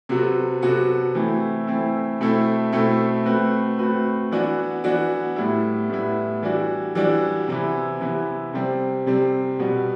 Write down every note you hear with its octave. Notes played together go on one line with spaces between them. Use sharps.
C3 F#3 B3 F#4 A4
C3 F#3 B3 F#4 A4
E3 A3 C4 E4
E3 A3 C4 E4
B2 A3 C4 E4 A4
B2 A3 C4 E4 A4
A3 C4 F#4 B4
A3 C4 F#4 B4
E3 B3 D4 F#4
E3 B3 D4 F#4
A2 G3 B3 E4
A2 G3 B3 E4
E3 G3 D4 F#4
E3 G3 D4 F#4
C3 E3 B3 E4
C3 E3 B3 E4
C3 G3 C4
C3 G3 C4
B2 G3 B3